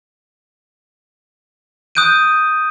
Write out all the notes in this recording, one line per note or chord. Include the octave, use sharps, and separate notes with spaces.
D#6 F#6 G6 D7 D#7